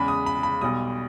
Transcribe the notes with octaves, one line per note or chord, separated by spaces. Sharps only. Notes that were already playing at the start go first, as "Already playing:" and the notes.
Already playing: E2 C#3 G#3 B5
D#6
B5
B5
B1 B2 G3 D#6